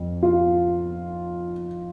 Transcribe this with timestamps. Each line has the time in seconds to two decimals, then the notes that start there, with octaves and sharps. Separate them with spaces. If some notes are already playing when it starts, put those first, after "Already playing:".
Already playing: F2
0.23 F4